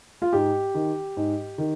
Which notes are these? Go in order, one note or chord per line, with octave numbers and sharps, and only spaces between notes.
F4
G#2 G4
D#3
G#2
D#3